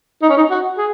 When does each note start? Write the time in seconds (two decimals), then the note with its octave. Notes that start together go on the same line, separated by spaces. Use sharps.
0.22 D#4
0.29 C#4
0.37 D#4
0.50 F#4
0.78 G#4